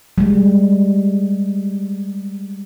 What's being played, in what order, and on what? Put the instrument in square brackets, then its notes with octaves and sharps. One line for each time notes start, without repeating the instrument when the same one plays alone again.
[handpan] G3 G#3